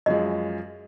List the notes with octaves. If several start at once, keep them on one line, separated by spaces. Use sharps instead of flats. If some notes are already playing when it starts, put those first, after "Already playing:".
F#2 F3 G#3 D#5